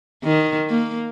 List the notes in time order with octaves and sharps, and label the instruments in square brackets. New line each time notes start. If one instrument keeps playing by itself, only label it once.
[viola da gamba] D#3
A#3